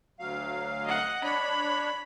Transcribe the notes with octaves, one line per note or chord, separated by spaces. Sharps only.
D2 F#3 F5
D#5 F#5
D4 C#5 B5